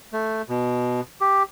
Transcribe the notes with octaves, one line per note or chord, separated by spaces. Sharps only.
A3
B2
G4